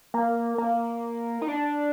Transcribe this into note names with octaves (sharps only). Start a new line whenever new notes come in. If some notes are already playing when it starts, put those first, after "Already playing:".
A#3
A#3
D#4
D4